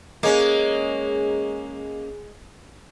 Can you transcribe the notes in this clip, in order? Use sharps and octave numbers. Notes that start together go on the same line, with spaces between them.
G#3 A#3 C#4